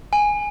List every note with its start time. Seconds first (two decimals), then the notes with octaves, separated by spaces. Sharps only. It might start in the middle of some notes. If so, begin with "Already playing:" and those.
0.13 G#5